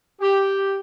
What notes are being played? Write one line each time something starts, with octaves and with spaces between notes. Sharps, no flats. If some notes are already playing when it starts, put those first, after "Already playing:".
G4